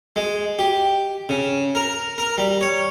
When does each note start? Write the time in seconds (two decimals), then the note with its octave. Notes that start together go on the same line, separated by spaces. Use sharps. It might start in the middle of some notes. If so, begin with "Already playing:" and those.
0.16 G#3
0.59 G4
1.29 C#3
1.75 A#4
2.18 A#4
2.38 G3
2.61 C#5